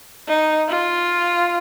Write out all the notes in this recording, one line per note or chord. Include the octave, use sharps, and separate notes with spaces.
D#4
F4